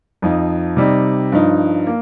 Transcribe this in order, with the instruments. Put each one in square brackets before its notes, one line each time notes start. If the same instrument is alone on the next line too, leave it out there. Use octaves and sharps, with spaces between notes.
[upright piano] F2 F3 D#4
C3 G3 D#4
G2 F3 D#4
A#3